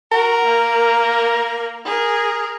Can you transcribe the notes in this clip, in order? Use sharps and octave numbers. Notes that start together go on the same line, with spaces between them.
F#4 A#4
A#3
G#4 A#4